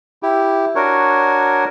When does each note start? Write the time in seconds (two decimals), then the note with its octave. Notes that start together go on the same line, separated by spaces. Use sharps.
0.23 E4 G4
0.75 D4 F#4 A#4 C#5